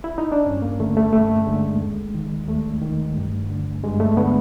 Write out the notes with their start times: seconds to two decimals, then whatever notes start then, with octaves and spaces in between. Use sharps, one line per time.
0.04 E4
0.18 D#4
0.32 D4
0.46 G2 C#4
0.62 A#3
0.80 D3 A3
0.97 A3
1.13 G2 A3
1.47 D3 G#3
1.80 D#2
2.15 D#3
2.48 D#2 A3
2.82 D#3
3.16 G2
3.50 D3
3.84 G2 G#3
4.00 A3
4.17 D3 B3